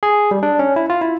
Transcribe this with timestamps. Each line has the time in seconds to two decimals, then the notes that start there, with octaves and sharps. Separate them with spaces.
0.03 G#4
0.31 G3
0.43 D4
0.59 C#4
0.76 E4
0.90 F4
1.01 E4